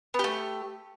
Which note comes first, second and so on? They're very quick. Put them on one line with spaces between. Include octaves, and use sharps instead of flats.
B3 G4 A3